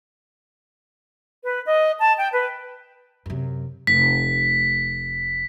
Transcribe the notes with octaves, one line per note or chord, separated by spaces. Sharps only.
B4
D#5
A5
G5
B4
F#2 C3
F1 B6